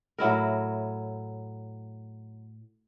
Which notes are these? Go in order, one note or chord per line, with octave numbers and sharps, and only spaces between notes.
A2 F#3 E4 A#4